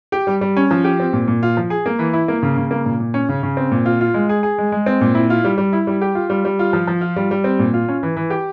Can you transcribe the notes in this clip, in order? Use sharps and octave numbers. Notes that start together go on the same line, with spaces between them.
G4
G3
G3
C#4
F3
G4
C4
A#2
A#2
F4
F3
G#4
A#3
E3
E4
A#3
C#3
C#3
A#3
A#2
A#2
C#4
C#3
C#3
C4
A#2
F4
F4
G#3
G#4
G#4
G#3
G#3
C4
A#2
E4
F4
G3
G3
E4
G3
G4
F4
G3
G3
F4
F3
F3
F4
G3
G3
C4
A#2
F4
C#4
E3
E3
G4